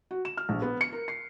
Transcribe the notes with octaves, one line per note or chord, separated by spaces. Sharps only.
F#4
E7
F6
A#1
B3
C#7
A#4
C7